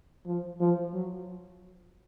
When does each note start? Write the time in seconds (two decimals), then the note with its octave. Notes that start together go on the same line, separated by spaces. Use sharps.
0.26 F3
0.60 F3
0.93 F#3